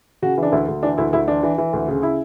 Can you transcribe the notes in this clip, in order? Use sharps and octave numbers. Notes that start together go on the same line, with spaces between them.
C#3 F#4
E3
D4
D2 E4
D2
E3 D4
D2 E4
D2 E4
E3 D4
E3
E3
D2
C#3
E4